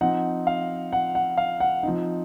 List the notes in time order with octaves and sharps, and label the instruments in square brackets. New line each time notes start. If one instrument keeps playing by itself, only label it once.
[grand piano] F3 C4 D#4 F#5
F5
F#5
F#5
F5
F#5
F3 C4 D#4